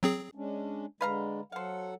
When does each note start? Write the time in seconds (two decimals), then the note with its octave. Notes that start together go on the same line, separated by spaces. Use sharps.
0.03 F#3 C4 G#4
0.35 G#3 C#4 D4
1.01 D3 G#3 B4 F5 A#5
1.52 F#3 A4 C5 F5 F#5